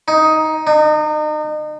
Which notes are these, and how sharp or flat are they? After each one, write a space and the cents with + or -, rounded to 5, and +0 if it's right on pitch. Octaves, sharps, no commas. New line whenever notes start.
D#4 +10
D#4 -35